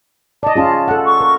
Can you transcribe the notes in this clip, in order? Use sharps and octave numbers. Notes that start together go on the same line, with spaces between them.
D5 D#5 A5
C#4 F4 G#4 A5
A4 F#5
C#6
A#4